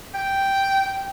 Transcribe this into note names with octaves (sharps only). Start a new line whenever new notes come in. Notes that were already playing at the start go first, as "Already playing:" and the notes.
G5